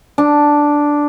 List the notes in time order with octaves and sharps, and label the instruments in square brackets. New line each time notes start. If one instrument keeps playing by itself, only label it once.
[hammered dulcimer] D4